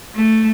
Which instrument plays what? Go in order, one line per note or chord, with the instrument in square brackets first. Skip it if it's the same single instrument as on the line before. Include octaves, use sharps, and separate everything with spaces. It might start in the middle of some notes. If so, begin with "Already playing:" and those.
[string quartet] A3